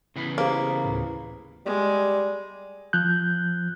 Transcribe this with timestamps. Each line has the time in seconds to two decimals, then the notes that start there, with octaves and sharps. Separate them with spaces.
0.16 C#3 E3 B3
0.38 A#3 G4 G#4 C5
0.85 D2 A2
1.66 G3 G#3
2.93 F3 F#6 G6